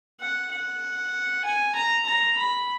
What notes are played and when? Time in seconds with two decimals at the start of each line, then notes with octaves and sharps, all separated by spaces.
0.20 F#5
0.51 F#5
1.45 G#5
1.75 A#5
2.06 A#5
2.37 B5